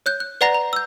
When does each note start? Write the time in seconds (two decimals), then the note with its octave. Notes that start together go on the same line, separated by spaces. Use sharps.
0.06 C#5 F#6 G6
0.20 F#6
0.41 B4 D5 F#5 A#5 A6 A#6
0.54 A#5
0.73 E6 G6